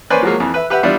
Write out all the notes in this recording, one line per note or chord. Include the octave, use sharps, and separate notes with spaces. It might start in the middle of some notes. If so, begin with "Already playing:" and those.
A#3 C#4 B4 C5 D5 G#5
F3 F#3 G#3 A#3
F2 E3
B4 E5
G4 B4 E5 F#5
G3 B3 D4 E4 F4